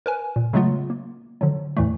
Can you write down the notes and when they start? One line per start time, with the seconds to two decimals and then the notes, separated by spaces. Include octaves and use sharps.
0.06 A#4 B4 G#5
0.36 A#2
0.53 C#3 F#3 G#3 A3 B3 F4
0.90 A#3
1.41 D3 F3 F#3
1.77 E2 A2 E3 G3 A3